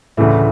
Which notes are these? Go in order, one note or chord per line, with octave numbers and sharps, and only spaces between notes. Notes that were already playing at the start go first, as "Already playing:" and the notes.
D2 A2 C#3 E3 A3